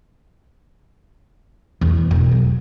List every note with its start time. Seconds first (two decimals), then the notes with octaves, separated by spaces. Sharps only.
1.81 E2
2.11 E1
2.32 F#3